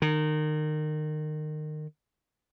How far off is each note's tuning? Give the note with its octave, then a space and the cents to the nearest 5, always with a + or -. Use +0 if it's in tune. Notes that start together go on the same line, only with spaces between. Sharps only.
D#3 -25